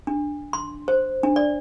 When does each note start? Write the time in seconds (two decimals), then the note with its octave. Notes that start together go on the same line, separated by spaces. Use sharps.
0.07 D4
0.53 C6
0.88 C5
1.23 D4
1.36 D5